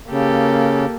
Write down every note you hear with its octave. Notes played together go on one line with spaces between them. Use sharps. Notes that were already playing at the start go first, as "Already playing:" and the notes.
C#3 A#3 G4 A4